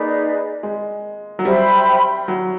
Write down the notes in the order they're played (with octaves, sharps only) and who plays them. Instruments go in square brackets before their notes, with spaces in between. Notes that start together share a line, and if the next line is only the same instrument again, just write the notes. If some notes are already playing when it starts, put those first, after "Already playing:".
Already playing: [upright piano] A#3 [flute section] D#4 G#4 B4 D5
[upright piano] G#3
F#3
[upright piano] G3 [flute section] C5 E5 G5 B5
[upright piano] F#3